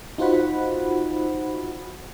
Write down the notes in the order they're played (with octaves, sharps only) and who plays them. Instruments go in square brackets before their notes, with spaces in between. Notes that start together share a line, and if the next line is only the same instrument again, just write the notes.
[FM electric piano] D#4 F4 F#4 C5 F#5 B5